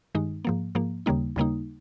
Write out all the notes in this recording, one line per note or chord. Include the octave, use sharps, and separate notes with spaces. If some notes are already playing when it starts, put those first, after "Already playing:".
G2 D#3 G#3 D#4
G#2 F3 A#3
G#2 F3 A#3
D#2 C#3 G3 A#3 D#4
D#2 C#3 G3 A#3 D#4